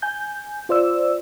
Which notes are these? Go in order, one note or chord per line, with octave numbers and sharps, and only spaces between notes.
G#5 G6
F4 C5 D5 E6